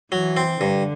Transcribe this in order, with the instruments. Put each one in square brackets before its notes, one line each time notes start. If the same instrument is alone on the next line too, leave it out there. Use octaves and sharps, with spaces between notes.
[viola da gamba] E3 [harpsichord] F#3
[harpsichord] C4
[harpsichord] G2 [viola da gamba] D3